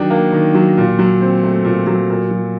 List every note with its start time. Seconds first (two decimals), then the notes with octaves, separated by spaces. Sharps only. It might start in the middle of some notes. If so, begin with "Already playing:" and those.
Already playing: D#3 F#3 D4
0.10 A#3
0.32 D#3
0.55 F#3
0.77 A#2
0.99 F#3
1.21 C4
1.43 A3
1.64 A#2
1.87 F#3
2.10 A#2
2.31 F#3